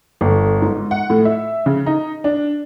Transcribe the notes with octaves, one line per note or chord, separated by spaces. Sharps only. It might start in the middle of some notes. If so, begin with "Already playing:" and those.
G1
G#2
F#5
A2
E5
C#3
D#4
D4